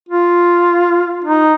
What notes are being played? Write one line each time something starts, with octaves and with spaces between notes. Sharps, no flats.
F4
D#4